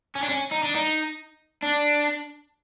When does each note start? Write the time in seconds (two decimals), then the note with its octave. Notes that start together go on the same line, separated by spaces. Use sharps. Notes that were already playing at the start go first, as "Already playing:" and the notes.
0.15 C#4
0.23 D4
0.29 C#4
0.51 D#4
0.63 D4
0.75 D#4
1.63 D4